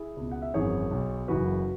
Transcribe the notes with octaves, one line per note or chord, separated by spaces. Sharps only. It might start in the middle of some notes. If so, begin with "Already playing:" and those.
Already playing: E4 G#4
C#2 B2
F#5
E5
G#1 F#2 E3 G#4 C#5
B1 B2
F#1 F#2 C#3 E3 F#4 B4